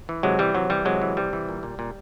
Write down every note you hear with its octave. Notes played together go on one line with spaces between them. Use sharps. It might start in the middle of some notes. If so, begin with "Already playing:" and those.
E3
C3 F#3 G#3
E3 G3
C3 F#3
E3 G3
C3 F#3 G#3
E3
C3 G3
E3
A#2
A#2
A#2